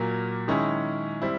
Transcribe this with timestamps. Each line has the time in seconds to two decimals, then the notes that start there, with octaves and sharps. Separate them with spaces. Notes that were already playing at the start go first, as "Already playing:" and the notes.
Already playing: A#2 F#3 A#3
0.48 D#3 G#3 C#4 E4
1.22 G3 C4 E4